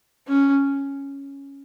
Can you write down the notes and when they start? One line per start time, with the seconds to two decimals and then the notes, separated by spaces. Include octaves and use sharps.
0.28 C#4